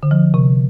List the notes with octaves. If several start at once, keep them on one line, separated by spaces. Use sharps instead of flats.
D3
F3
C3